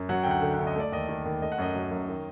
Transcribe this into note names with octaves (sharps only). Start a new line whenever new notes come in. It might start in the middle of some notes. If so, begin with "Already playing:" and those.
Already playing: F#2
F#3 F#5
D2 G5
F#5
D3
F#5
D2
D#5
A3 D5
D#2 D#5
D#3
D#2
A3 D#5
F#5
F#2 D#5
F#3
F#2
D#3